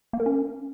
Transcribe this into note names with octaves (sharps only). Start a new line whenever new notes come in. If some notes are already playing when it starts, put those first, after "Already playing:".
A#3
A#4
C#4